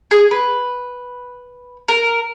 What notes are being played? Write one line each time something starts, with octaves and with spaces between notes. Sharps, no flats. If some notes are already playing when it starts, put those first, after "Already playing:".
G#4
B4
A#4